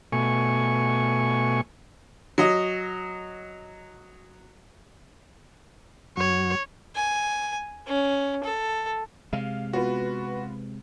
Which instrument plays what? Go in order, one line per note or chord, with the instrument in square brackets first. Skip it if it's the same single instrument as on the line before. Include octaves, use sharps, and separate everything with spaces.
[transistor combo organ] B2 A3 G#5 C#6
[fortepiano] F#3 D#5
[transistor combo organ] F#2 F#3 F#4 [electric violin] C#5
[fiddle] G#5
C#4
A4
[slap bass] C3 G#3 [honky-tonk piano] F5
[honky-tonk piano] B3 F4 B4 [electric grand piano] F#4